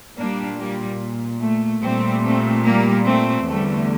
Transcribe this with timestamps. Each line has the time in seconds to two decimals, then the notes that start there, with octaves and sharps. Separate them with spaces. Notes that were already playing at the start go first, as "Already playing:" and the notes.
0.17 A#2 G3 A#3 D4
0.59 G3 A#3
1.41 A3
1.82 A#2 G3 A3 C4
2.23 A3 C4
2.64 G3 A#3
3.05 A3 C4
3.46 E2 D3 G3 A3